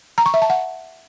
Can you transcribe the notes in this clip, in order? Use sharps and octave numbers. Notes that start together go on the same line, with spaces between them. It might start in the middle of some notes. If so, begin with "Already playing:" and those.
A#5
C#6
E5
A5
F#5